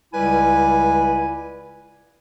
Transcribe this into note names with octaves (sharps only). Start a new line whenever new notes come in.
C#2 C#3 G3 E4 B4 G#5